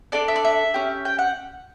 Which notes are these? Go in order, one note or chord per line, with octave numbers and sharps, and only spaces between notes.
D4 A4 D5
E5
D5
E5
C#4 G4
G5
F#5